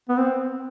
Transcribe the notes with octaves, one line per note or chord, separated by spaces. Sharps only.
B3
C4